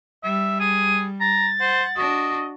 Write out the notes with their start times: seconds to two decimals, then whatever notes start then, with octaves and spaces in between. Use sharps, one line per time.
0.24 G3 E5
0.60 G#4 D#7
1.20 A#5 A6
1.61 C5 F#5
1.97 D4 F#4 D#5